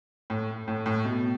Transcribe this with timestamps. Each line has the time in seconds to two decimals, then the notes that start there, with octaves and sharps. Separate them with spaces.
0.30 A2
0.68 A2
0.86 A2
1.05 B2